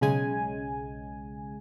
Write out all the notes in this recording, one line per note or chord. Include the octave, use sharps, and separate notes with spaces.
B1 C#3 G#3 G#5